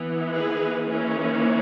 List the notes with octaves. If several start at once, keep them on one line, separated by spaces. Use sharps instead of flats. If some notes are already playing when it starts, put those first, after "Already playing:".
Already playing: E3 B3
G#4 B4
E3 A#3 C#4